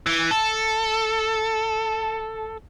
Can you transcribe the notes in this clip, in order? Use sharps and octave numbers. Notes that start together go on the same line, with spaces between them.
E3
A4